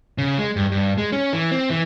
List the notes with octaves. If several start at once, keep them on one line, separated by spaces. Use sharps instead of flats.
C#3
G#3
G2
G2
G#3
C#4
E3
C4
E3